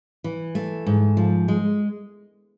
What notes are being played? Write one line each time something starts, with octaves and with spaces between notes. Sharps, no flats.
E3
A3
G#2
F3
G#3